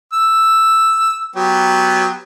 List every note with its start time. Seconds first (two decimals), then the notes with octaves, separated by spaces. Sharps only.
0.13 E6
1.36 F#3 B3 G4